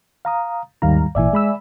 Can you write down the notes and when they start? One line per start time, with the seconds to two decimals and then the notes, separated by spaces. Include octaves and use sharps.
0.25 F5 A#5 D#6
0.82 D#2 G#2 D#3 G3 F5 A#5
1.15 G#1 A#2 E3 D5 E5 G#5
1.33 G#3 B5 E6